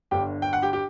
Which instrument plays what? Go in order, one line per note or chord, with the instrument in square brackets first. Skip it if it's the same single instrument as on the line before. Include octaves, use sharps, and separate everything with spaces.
[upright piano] G1 G2 D3 G4 G5
G5
F#5
G4 G5
G4 G5